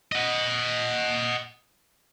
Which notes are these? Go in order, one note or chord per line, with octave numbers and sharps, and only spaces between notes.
D#5 F#5